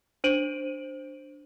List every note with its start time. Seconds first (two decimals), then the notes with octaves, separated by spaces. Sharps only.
0.24 D4 C5 D7 D#7 F#7